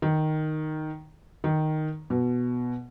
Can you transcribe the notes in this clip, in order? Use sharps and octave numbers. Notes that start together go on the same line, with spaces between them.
D#3
D#3
B2